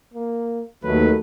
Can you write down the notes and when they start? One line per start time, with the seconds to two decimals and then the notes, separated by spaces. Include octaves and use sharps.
0.14 A#3
0.84 D#2 D#3 F#3 A3 B4